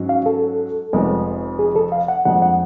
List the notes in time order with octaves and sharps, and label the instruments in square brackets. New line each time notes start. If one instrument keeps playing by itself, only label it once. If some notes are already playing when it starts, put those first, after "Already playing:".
Already playing: [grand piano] G#2 F#3 C#4
[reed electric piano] F5
A4
[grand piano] F1 F2 F3 G#3 B3
[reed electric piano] G#4
A4
F5
F#5
[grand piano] F2 F3 G#3 D4 [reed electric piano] F#5
[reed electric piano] F#5